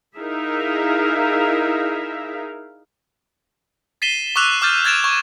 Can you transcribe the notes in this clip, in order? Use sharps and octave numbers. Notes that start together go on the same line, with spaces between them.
D#4 E4 G#4 A#4 E5 F5
A6 B6 C7 D#7 E7 G7
C#6 D6 E6 F#6 F7
D6 F6 G6 A6
F#6 G#6 A6 D7 E7 F7
C#6 G#6